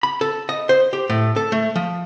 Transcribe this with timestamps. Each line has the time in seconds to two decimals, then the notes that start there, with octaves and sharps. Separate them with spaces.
0.03 B5
0.21 A4
0.49 D#5
0.69 C5
0.93 G4
1.10 A2
1.36 A4
1.52 A3
1.76 F3